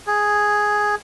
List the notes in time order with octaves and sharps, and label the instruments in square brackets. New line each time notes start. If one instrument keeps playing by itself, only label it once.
[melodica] G#4